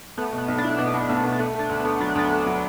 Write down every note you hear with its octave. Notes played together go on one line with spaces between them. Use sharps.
A3 B3
B2
B3
B1
D4
E4
B2 B3
B2
B1 A3
B2
D4
A3 B3
A3 D4
D2
B3
A3
F#3 D4
B3
D2 D4
A3 B3
F#3